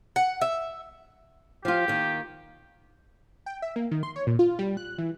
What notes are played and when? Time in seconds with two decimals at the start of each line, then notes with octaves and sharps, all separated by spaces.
0.16 F#5
0.41 E5
1.65 F3 F4 G4
1.88 D#3 A#3
3.46 G5
3.62 E5
3.76 A#3
3.91 D#3
4.03 C6
4.16 C#5
4.27 A#2
4.39 F4
4.59 G3
4.77 F#6
4.98 E3